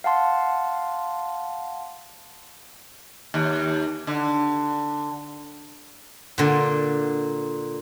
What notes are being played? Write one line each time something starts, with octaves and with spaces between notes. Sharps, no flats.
F5 F#5 A5 C6
D#2
D3
A#2 D3